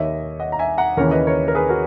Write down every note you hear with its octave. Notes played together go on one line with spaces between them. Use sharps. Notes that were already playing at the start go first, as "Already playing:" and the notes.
Already playing: D#2 D#3 C#5 D#5 E5
D#5 F#5
A#5
E5 G#5
F#5 A#5
D#2 C#3 E3 A#4 C#5
B4 D#5
A#4 C#5
A#4
G#4 B4
F#4 A#4